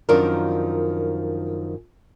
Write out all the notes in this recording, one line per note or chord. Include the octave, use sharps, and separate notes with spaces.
F#2 D#3 F3 D4 F4 A#4